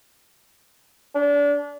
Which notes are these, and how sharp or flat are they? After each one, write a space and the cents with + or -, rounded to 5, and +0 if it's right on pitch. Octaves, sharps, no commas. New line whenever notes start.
D4 -30